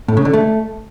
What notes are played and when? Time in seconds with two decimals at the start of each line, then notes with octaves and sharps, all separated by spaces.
0.08 A2
0.17 C#3
0.25 D3
0.33 A3